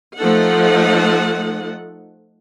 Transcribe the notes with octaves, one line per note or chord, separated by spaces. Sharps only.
F3 A3 D#4 A4 F#5